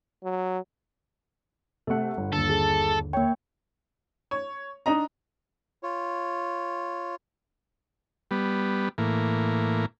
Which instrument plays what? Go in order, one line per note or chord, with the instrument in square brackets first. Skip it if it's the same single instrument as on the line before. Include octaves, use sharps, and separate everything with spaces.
[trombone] F#3
[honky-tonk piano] C3 A3 [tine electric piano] A4 F#5
[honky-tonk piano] G1
[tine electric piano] D#2 D3 [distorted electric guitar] A4
[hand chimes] G#4
[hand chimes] A#3 G5 [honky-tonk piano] C#5
[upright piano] C#5
D4 D#4 D#5 A#5
[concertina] F4 C#5
[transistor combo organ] G3 B3
A2 E3 A#3